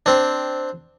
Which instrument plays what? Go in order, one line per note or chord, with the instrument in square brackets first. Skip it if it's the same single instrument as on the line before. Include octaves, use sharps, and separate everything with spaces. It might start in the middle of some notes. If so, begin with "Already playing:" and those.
[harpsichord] C4 D4